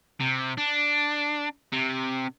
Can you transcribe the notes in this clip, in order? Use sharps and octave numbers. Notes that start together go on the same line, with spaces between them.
C3
D4
C3